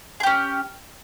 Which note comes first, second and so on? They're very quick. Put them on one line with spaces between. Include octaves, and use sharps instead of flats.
G#4 G4 C#4